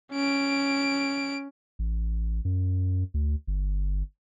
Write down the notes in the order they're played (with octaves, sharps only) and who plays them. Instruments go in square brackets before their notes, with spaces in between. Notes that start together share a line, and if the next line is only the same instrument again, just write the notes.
[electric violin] C#4 D7
[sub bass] A1
F#2
D2
G1